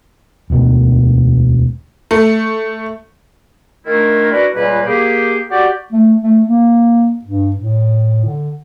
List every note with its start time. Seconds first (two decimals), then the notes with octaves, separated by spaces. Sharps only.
0.50 E1 D2 B2 D#3
2.11 A3
3.86 D#3 A3 D4 E4 F4 A#4
4.31 D4 E4 F#4 A#4 B4
4.54 C#2 A#2 G3 A#3 B4
4.86 A#3 G4 G#4
5.51 F#4 G4 D5
5.93 A3
6.22 A3
6.46 A#3
7.25 G2
7.56 A2
8.25 D3